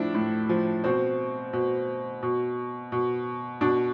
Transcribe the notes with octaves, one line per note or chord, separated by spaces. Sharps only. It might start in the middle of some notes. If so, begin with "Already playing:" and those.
Already playing: A2 F3 D4 E4
A2
F3
B2 C4
B2
B2
B2
B2 D4